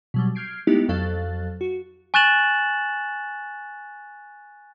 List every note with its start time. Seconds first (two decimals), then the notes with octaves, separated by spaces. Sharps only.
0.14 B2 F#3 G3
0.35 F6 G6 G#6 C7 D7
0.67 G#3 A3 B3 D#4 E4 G4
0.89 F2 F#3 A4 F5 F#6 A6
1.61 F#4
2.14 G#5 C#6 F#6 A6 E7 F#7